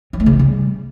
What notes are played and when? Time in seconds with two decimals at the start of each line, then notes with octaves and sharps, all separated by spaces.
0.13 F#3
0.20 A3
0.26 C#3
0.33 G#3
0.39 G3